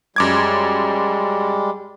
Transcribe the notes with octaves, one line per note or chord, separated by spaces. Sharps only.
F#2 G3 G#3 D6 G#6